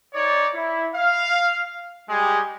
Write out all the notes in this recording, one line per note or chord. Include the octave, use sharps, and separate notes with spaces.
D#4 C#5 D5
E4
F5
G3 G#3 G4 G#4